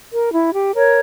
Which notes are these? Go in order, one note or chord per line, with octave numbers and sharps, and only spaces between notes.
A#4
E4
G4
A#4 C#5